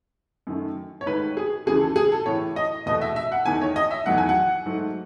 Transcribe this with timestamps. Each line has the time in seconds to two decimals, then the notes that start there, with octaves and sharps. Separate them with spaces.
0.47 F#2 D#3 A3
1.01 C#5
1.06 G#2 D#3 A3 B4
1.37 G#4
1.66 D#2 C#3 E3 A3 G#4
1.81 A4
1.96 G#4
2.12 A4
2.26 A2 E3 A3 C#5
2.56 D#5
2.86 E2 B2 A3 D#5
3.01 E5
3.16 E5
3.32 F#5
3.46 E2 D#3 A3 G#5
3.62 C#5
3.76 D#5
3.91 E5
4.06 E2 D#3 F#3 A3 F#5
4.18 G#5
4.29 F#5
4.66 G#2 F#3 A3